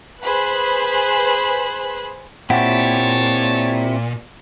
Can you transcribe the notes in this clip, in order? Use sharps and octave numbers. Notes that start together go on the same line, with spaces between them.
G#4 B4 C5 B5 F#6
A#2 C4 E4 G4 C#5 F#5 G5 A5